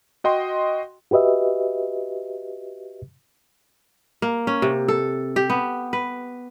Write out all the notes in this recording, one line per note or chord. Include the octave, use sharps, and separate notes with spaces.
F#4 D#5 G5 C6
F#4 G4 B4 D#5 E5
A#3
C#4
C3
A4
G4
B3
B4